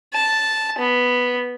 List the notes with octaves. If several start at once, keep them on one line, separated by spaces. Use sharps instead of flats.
A5
B3